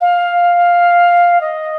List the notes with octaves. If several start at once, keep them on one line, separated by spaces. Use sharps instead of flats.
F5
D#5